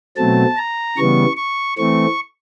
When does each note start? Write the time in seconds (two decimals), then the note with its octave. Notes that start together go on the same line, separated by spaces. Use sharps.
0.16 B2 F#3 A3 C4 A5
0.57 A#5
0.97 C#3 E3 G3 B3 C#6
1.37 C#6
1.78 E3 A3 C4 C#6